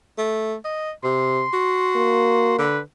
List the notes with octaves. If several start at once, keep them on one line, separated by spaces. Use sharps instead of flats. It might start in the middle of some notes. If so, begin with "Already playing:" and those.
A3
D#5
C3 C6
F#4
A#3
D3 B4